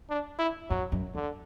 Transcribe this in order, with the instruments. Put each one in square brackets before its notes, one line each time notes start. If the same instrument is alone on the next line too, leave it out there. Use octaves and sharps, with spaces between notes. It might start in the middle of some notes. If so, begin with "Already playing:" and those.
[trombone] D4
E4
[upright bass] F#2 [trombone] F#3
[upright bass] F#2
[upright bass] E2 [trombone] D3